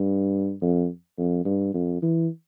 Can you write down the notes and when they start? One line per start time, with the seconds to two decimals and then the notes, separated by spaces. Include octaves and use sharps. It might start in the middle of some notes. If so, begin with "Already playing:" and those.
Already playing: G2
0.62 F2
1.18 F2
1.45 G2
1.74 F2
2.02 E3